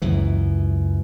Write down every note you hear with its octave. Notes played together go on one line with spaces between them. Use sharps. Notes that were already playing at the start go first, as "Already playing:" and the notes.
C#2 F#2 E3